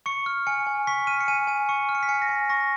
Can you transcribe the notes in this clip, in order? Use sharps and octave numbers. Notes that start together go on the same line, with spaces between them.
C#6 C#7
F6
G#5 C#7
G#5
C#6 B6
F6 D#7
C#7
G#5 D#7
G#5 D#7
C#6 C#7
F6
C#7
B6
G#5 C#7
A#6
G#5
C#6 A#6